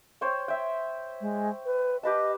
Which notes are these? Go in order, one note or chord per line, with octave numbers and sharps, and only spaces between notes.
C5 C#5 G5
E5 G5
G#3
B4
G4 B4 D#5 A5